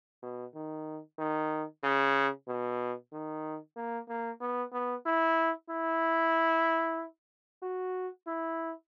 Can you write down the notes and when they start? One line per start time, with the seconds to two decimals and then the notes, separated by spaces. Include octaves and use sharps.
0.23 B2
0.55 D#3
1.19 D#3
1.84 C#3
2.48 B2
3.12 D#3
3.77 A#3
4.09 A#3
4.41 B3
4.73 B3
5.06 E4
5.70 E4
7.63 F#4
8.27 E4